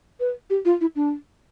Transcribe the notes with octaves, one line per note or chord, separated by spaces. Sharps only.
B4
G4
F4
E4
D4